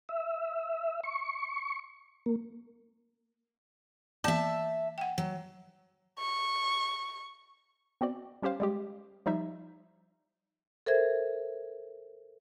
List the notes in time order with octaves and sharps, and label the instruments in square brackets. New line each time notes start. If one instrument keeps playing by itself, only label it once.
[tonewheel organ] E5
C#6
A#3
[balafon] E3 A#3 B3 [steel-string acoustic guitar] E5 A5
[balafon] F#5 G5
[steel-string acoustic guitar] F#3
[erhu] C#6
[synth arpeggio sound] B3 C4 F#4 D5
G3 C#4 G4 C5 F5
G3 G#3 G4
F3 G3 D#4 E5
[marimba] A4 A#4 C5 E5 G#6